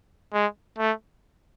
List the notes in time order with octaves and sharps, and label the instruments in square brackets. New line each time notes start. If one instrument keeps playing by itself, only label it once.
[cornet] G#3
A3